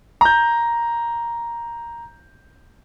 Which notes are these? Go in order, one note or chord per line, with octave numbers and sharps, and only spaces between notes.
A#5 G6